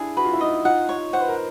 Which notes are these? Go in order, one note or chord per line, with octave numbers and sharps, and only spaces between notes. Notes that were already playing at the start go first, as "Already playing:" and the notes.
Already playing: D4 E4 G#4
F#4 B4
F4
E4
D#4 F4 D#5
D#4 F4 F#5
C#5
C5 F#5
B4
A#4